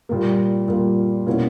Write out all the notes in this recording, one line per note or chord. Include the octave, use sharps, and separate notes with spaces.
A#2 G3 A#3
A#2 G3 A#3
B2 A#3 C#4 E4